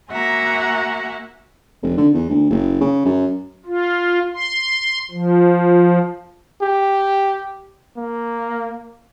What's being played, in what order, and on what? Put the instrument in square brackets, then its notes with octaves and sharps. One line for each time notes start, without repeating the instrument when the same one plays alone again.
[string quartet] A#3 F#4 E5 F#5 G#5 A#5
[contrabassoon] F1
D3
E2
D2
F#1
C#3
F#2
[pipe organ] F4
C6
F3
[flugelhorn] G4
A#3